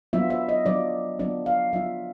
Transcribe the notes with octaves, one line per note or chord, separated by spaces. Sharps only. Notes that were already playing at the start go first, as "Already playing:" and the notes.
F#3 B3 D4 F4 E5
E5
D#5
F#3 B3 D4 F4 D5
F#3 B3 D4 F4 D5
F5
F#3 B3 D4 F4 E5